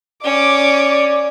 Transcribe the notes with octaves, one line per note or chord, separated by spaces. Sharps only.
C#4 D5 D6